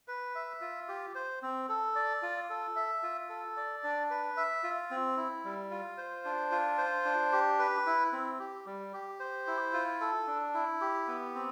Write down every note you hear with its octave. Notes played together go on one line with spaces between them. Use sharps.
B4
E5
F4
G4
C5
C4
A4
D5
F4
A4
E5
F4
A4
D5
D4
B4
E5
F4
C4
E4
G3
F4
C5
D4
F4
C5
D4
G4
B4
E4
C4
G4
G3
G4
C5
E4
F4
A4
D4
E4
G4
B3
C4